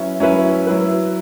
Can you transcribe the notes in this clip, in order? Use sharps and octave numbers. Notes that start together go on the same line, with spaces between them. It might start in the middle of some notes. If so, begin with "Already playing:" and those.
Already playing: F#3 C#4 E4 B4 E5
F#3 C#4 E4 B4 E5
F#3 E4 B4